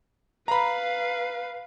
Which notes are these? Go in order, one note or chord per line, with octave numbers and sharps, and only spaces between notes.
B4 F5 A#5 B5